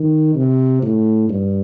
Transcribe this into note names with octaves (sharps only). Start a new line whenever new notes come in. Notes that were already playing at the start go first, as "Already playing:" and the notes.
Already playing: D#3
C3
A2
G2